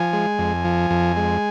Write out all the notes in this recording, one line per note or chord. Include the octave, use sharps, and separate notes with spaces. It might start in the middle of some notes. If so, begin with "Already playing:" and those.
Already playing: F3 G#5
G#3
F2
F3
F2
G#3